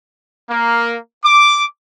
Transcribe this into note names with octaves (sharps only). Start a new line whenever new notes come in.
A#3
D6